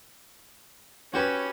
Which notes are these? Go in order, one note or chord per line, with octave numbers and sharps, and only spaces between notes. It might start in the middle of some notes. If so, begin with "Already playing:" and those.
C#4 F#4 G4 B4